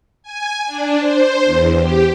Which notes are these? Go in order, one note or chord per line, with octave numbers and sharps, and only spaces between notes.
G#5
D4
C5
E2
G4